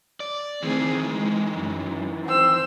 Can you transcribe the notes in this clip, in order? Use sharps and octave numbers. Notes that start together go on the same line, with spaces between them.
D5
D#3 E3 A3 C4 G#4
G#3
F#2
C4 E6